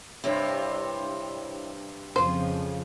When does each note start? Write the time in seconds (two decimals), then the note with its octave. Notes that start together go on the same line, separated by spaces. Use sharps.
0.24 G2 C3 E4 G4 C#5
2.16 F2 C#3 F3 F4 G#4 C5